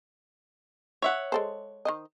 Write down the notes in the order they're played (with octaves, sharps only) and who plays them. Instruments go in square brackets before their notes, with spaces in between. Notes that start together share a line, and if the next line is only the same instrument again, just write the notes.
[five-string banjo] C#5 E5 F#5
[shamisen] G#3 A4 C5
D#3 C5 D#5